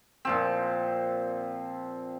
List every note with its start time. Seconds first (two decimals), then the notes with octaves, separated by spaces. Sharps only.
0.25 A#2 F3 C4